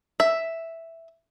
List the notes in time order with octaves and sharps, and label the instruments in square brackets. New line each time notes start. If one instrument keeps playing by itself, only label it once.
[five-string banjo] E5